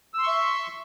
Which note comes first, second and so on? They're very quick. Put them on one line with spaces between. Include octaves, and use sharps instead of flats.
E6 C6 C#6 E5